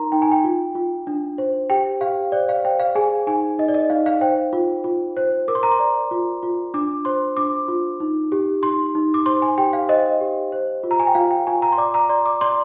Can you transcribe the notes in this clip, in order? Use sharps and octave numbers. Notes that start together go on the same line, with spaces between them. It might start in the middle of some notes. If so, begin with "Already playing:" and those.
Already playing: D#4 A#4 A#5 C6
D#4 G5
G#5
G5
F4
F4
D4
C5
G4 G5
G4 F5
C5 D5
F5
C5 G5
F5
G#4 G#5
D#4 G#5
D#4 D#5
D5
D#5
D#4 F5
F5
C5 G5
F4
F4
C5
A#4 D6
C6
A#5
C6
D5
F4
F4
D4 D6
C5 C6
D4 D6
F4
D#4
G4
D#4 C6
D#4
D6
C5 C6
G#5
G4 G5
F5
C5 D#5
G4
C5
F4
A#5
G#5
G5
F4 F5
G5
F4 G#5
A#5
C6
D5 D6
A#5
D5 C6
D6
D5 C6